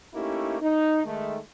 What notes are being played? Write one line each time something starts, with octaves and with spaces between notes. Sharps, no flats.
A3 A#3 C#4 D#4 E4 G4
D#4
D#3 G#3 A3